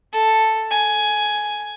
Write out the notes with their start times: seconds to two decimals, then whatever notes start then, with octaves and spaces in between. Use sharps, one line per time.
0.13 A4
0.71 G#5